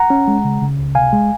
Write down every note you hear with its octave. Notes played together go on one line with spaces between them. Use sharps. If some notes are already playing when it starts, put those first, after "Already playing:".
Already playing: F#5 A#5
C#4
G#3
C#3
C#3
C#2
C3 F5 G#5
G#3